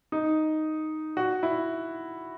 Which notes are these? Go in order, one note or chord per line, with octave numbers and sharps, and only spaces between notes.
D#4
F#4
E4